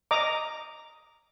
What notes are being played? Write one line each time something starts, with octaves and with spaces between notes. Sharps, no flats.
D#5 A#5 D6